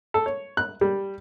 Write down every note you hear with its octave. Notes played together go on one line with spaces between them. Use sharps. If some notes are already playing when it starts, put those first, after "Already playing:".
A4
C#5
F#6
G3